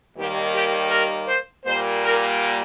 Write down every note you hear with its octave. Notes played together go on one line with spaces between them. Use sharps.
D#2 D#3 G3 A#3 G4
G4
A#4
C5
A#2 G3 A#3 C5
A#4